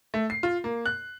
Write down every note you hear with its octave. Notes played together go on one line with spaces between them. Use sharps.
A3
C7
F4
A#3
F#6